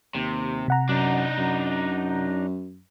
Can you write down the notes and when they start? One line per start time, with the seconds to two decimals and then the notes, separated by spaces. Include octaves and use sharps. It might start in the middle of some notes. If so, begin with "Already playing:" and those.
0.15 D#2 C3
0.68 C3 F#5 A#5
0.89 F#2 D4 D#4
1.38 F#2